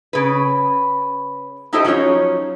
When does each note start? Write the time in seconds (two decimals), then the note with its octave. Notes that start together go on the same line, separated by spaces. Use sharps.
0.13 C#3 B4
1.73 D#4 E4 G4 A4 C5 D#5
1.85 F3 F#3 C#4 D#4 C#5